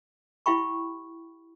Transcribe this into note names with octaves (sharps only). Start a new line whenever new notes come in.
E4 G4 F5 G5 B5 C#6